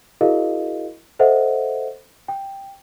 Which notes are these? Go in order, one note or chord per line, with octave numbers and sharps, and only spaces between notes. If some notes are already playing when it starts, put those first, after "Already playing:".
E4 F#4 G#4 A#4 D#5 F5
A4 C5 D#5 E5 F#5
G5